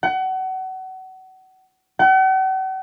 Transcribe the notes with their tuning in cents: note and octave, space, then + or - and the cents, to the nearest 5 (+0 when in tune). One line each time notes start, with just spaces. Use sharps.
F#5 +30
F#5 +45